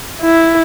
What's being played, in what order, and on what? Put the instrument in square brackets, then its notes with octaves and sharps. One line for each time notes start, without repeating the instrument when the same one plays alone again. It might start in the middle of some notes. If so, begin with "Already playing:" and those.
[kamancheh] E4